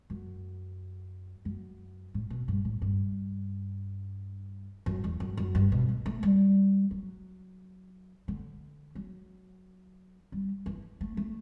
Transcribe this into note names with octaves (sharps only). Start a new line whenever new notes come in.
F#2
F#2
A2
B2
G2
A2
G2
F#2
E2
F#2
F#2
G2
B2
D3
A3
G3
F#3
D3
F#3
G3
E3
A3
A3